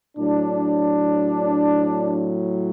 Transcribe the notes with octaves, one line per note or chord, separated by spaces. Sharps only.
A2 F#3 D4